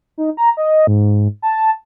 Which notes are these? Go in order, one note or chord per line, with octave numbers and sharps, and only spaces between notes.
D#4
A#5
D#5
G#2
A5